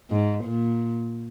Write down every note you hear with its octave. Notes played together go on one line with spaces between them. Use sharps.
G#2
A#2